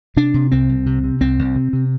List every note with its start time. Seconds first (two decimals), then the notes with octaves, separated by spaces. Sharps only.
0.16 C3 D4
0.34 C3
0.52 C2 C4
0.69 C2
0.86 C3
1.04 C3
1.21 C2 C4
1.39 C2
1.56 C3
1.73 C3